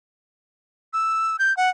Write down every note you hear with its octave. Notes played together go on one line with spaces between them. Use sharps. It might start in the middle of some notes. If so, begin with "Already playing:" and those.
E6
G6
F#5